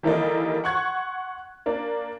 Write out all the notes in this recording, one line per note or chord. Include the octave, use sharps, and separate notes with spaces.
D#3 E3 G3 A#3 A4 D#5
F#5 C6 C#6 F#6 G#6
A#3 D4